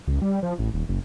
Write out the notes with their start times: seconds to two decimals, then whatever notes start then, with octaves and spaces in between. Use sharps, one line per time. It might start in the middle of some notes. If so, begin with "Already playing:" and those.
0.07 C#2
0.22 G3
0.43 F3
0.59 A1
0.74 D#1
0.89 F#1